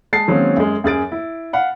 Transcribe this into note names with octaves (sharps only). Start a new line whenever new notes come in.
G#3 A5 A6 C7
D#3 F#3 G#3 A#3 C4 C#4
F#2 G#3
F#2 G#4 A6 D7
E4
F5 F#5 B5